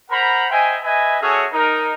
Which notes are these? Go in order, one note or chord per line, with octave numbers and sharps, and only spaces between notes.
A#4 C5 F#5 A#5 B5
C5 D#5 E5 G5 G#5
B4 D#5 E5 G#5
C#4 F#4 G#4 A4 C#5 E5
D#4 A#4